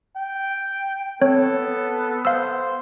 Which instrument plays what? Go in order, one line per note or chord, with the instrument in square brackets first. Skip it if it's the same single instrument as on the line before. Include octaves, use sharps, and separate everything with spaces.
[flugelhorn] G5
[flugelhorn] B3 [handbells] C4 C#5 [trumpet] A4
[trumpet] C5 [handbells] F5 E6